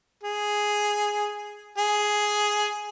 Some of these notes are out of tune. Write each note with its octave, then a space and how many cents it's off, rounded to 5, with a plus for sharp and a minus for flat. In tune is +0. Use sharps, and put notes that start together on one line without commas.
G#4 +0
G#4 +5